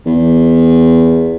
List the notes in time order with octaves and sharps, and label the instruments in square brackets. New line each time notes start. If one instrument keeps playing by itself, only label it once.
[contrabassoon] E2